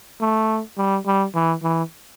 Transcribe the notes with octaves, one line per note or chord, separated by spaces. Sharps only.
A3
G3
G3
E3
E3